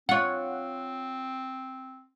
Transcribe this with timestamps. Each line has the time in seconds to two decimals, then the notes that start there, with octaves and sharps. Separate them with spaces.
0.09 C4 F4 C#5 F#5